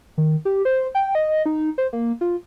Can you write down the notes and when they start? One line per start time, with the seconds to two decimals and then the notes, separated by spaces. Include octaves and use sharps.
0.18 D#3
0.45 G4
0.65 C5
0.95 G5
1.15 D#5
1.46 D#4
1.78 C5
1.93 A#3
2.21 F4